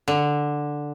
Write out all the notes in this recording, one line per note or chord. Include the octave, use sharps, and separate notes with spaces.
D3